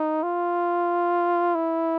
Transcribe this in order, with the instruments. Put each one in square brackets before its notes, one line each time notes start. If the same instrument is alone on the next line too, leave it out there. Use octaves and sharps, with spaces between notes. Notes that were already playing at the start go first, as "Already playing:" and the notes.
Already playing: [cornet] D#4
F4
E4